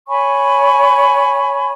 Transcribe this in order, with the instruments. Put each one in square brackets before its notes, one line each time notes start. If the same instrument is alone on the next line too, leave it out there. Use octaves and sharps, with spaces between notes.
[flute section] C#5 G#5 B5 C#6